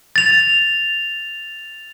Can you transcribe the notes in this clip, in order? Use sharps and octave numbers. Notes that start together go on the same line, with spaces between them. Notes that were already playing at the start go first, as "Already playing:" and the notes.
A6 F7